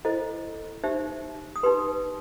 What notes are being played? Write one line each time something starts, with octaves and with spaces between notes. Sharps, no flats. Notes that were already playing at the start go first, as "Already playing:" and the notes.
E4 A4 C5 D#5
D#4 G4 C5 E5
D#6
D#4 G4 B4 C6